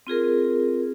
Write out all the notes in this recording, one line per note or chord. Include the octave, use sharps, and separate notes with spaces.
C4 F4 G#4 A#4